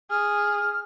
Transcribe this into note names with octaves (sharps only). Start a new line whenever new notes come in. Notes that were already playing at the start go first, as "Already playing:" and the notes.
G#4 F6